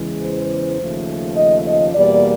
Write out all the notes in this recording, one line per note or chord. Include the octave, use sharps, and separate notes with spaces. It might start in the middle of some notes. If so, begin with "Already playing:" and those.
Already playing: E2 C#3 E3 G#3
C5
D#2 C#3 F3 A3
D#5
D#5
E2 B2 G3 A#3 D5